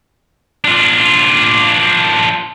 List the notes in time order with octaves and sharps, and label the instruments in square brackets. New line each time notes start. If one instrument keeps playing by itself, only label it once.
[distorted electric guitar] D4 F4